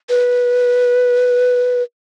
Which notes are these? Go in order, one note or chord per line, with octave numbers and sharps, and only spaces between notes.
B4